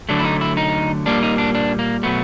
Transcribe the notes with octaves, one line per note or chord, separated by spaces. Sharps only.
D3 F#3 A3 D4
E4
D#4
E4
D#4
A#2 G3 A#3 D4
D#4
D4
D4
A#3
B2 F#3 A3 B3